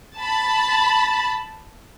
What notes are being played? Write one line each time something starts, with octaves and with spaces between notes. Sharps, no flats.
A5 B5